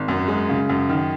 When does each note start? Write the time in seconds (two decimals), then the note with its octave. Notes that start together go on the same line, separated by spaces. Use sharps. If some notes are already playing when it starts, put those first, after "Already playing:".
Already playing: G#1
0.08 F#2
0.28 G#3
0.49 C#3
0.69 F#2
0.89 D#3